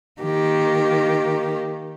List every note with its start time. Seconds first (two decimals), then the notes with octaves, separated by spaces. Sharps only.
0.22 D#3 A#3 G4